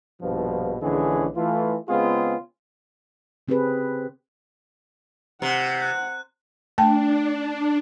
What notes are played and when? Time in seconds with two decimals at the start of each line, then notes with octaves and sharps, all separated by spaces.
0.22 A#1 G2 B2 F3
0.82 A#1 D3 E3 G#3 C#4 G#4
1.36 E3 A3 F4
1.89 C#3 G#3 B3 C4 F4 G#4
3.48 C#3 C4 G4 G#4 B4
5.42 C3 F#5
5.82 F#6
6.78 A3 D4 G5 A5